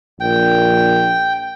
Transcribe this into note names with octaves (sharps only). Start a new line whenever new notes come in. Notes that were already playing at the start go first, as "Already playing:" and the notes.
A#1 G5